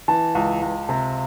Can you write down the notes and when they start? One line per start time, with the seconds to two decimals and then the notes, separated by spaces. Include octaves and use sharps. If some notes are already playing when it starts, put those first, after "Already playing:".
0.08 E3 A5
0.35 C#2
0.62 C#2
0.89 C3